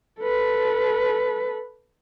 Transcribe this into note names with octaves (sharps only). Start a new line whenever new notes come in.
A4 B4